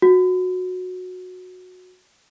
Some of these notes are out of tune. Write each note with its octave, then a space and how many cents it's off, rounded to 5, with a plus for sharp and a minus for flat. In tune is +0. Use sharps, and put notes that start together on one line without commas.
F#4 -15